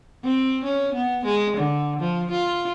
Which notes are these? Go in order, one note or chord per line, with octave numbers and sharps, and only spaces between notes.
C4
C#4
B3
G#3
D3
F3
F4